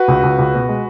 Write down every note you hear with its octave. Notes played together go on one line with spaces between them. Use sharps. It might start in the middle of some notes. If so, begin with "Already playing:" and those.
Already playing: F#4 B4
C#2
C#2
C#2
B2
G#3